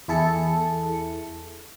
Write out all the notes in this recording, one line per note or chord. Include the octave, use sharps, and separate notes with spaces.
E2 E4 G#4 A4 A5 C#7